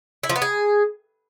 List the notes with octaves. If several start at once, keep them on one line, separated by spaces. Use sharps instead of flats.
E4
F3
B3
G#4